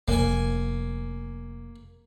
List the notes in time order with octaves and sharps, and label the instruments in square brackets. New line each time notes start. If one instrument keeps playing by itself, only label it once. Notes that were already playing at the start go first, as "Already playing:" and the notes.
[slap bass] F1 [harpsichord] A#3 G#5